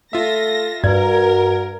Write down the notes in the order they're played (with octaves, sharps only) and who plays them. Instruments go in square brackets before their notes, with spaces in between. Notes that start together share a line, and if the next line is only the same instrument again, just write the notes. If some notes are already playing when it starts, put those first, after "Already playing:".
[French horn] A3 [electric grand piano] F4 E5 [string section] A#6
[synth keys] G2 [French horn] F#4 [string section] A#4 [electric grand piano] G#6